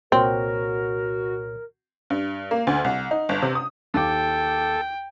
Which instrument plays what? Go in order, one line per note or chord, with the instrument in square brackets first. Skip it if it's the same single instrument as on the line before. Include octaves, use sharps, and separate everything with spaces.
[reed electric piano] C2 A#2 C#5 [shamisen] C4 [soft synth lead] F#4 [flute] A#4
[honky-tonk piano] G2
A#3
D2
C2
D#4
G1
C3
D#6
[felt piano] D#2 D6 [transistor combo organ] A4 [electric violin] G5